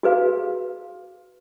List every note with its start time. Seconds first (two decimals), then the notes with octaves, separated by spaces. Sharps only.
0.03 F#4 G#4 B4 F5